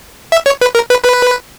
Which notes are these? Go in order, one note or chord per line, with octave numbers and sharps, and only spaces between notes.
E5
C#5
B4
A#4
B4
B4